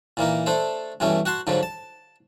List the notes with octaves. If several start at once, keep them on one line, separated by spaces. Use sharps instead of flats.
A#2 E3 A#3 D#4
A3 D4 A4 C5
G2 B2 E3 A3 C#4
F#4 F#5 A5 C6
G#2 D3 F3 F#3
A5